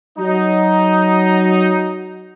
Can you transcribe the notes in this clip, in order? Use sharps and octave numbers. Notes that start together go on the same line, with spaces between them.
F#3 D#4